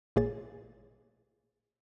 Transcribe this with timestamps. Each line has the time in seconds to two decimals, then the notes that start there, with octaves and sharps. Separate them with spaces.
0.16 A1 A#2 A#3 G#4 C#5 A6